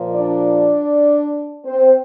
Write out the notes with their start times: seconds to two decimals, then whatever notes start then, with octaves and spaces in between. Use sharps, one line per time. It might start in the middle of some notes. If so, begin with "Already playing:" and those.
Already playing: A#2 F3
0.13 D4 D5
1.65 C4 C5